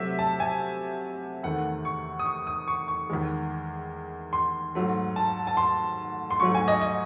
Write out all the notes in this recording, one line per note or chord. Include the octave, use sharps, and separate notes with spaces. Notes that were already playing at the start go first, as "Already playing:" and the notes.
Already playing: C3 F#3 A3 E5
A5
G#5
E2 D#3 A3 F#5
C#6
D#6
C#6
D#6
C#6
C#6
E2 D#3 G#3
C6
G#2 F#3 A3
A5
A5
C6
C6
G#2 F#3 A3 C#6
G#5
D#5
D#5